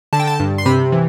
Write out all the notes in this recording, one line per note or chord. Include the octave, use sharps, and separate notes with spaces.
D3 A5
G5
A5
G2
C6
C3 B5
E3